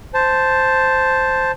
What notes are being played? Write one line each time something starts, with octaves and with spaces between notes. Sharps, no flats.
C5 A5